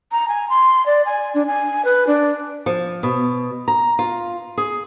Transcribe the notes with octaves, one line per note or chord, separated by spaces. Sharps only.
A#5
G#5
C6
D5
G#5
D4
G#5
B4
D4
F3
B2
A#5
F4
G#4